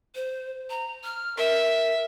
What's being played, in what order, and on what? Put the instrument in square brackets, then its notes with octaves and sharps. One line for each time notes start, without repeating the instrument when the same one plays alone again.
[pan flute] C5
A#5
F6
[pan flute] A#4 [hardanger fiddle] E5